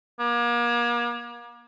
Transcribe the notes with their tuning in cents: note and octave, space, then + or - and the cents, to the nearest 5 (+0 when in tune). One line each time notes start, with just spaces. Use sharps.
A#3 +40